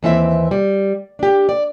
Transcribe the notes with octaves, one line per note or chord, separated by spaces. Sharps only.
D#2 E3 C4 E5
G3
D4 G4
D5